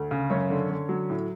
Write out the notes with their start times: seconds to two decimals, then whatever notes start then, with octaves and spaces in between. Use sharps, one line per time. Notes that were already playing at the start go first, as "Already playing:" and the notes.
Already playing: D2
0.11 C#3
0.30 F#2 C#4 C#5
0.50 D3
0.70 D3
0.89 F#3
1.10 A2